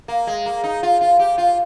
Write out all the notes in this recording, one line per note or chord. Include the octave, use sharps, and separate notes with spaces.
A#3
G#3
A#3
D#4
F4
F4
G4
F4